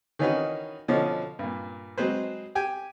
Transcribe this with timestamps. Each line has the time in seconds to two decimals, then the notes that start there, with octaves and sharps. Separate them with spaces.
0.19 D#3 E3 C#4 D#4 F#4 B4
0.88 B2 D3 F3 C#4 D#5
1.39 G2 A#2
1.98 F#3 G#3 C4 G#4 B4 C5
2.55 G4 G5 G#5